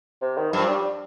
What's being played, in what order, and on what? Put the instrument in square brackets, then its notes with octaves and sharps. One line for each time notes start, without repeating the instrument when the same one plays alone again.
[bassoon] C3
D#3
[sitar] G2 [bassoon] F3
[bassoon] G3